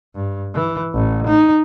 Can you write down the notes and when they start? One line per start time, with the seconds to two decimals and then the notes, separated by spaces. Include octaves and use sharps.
0.16 G2
0.54 E3
0.94 A1
1.27 D#4